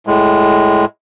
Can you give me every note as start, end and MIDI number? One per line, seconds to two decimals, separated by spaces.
0.07 0.85 45
0.07 0.85 56